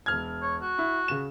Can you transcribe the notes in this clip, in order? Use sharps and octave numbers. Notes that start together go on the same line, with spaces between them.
E1 F6 G#6
C#5
F#4
E4
C#3 E7